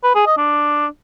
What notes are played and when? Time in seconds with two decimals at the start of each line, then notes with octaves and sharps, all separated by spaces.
0.04 B4
0.15 G#4
0.26 D#5
0.38 D4